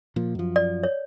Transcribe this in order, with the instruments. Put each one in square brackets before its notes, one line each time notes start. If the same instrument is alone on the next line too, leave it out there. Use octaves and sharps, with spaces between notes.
[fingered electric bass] A#2 F3
F#2 F3
[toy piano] D5
C#5